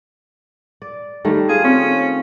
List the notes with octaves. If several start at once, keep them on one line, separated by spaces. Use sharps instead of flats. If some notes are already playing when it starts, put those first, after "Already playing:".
D5
D#3 G3 A3
F4 G#4
C4 C#4